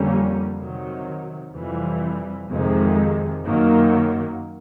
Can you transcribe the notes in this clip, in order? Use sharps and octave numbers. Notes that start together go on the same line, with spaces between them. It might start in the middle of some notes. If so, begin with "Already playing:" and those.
Already playing: F2 D3 G3 A#3 C#4
C3 D#3 F#3
F2 C3 E3 G3
F2 C3 D#3 G#3
F#2 D#3 F#3 A#3